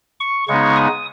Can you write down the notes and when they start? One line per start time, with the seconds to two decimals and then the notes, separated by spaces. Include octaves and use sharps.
0.20 C#6
0.48 C#3 G#3 B3 D#4 C#6
0.76 D#6